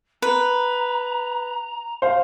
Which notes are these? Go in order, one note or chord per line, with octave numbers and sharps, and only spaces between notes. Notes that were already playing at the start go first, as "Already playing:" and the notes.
B4 A#5
C5 F5